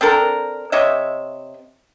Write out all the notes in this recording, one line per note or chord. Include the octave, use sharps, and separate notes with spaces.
C4 D4 A4 A#4
C3 C#5 D#5 E5